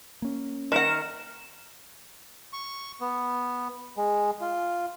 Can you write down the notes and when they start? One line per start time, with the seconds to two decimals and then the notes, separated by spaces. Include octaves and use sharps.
0.22 A#3 C#4
0.72 D#3 A#4 F#5 E7
2.53 C#6
3.01 B3
3.97 G#3
4.41 F4